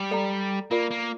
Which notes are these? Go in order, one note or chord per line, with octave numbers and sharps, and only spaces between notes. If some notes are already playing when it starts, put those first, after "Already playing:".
Already playing: G3
A4 D5 G5 A#5
A#3 F4 A#4 D5
A#3